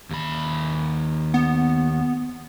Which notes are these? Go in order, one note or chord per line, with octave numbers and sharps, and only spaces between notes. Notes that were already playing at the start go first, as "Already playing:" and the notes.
D#2 B5
B3